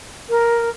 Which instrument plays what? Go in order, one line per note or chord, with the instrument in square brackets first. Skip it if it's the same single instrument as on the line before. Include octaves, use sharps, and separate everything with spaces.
[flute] A#4